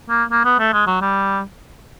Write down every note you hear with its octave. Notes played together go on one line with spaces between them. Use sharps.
A#3
A#3
B3
A3
G#3
F#3
G3